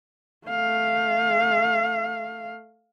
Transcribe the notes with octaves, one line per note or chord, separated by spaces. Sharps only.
A3 F5